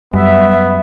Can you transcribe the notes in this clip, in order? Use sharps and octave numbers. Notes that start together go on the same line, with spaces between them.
F#2 G3 B3 E5